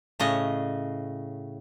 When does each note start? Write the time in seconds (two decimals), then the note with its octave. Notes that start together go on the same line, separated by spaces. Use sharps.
0.20 A2 C#3 D#5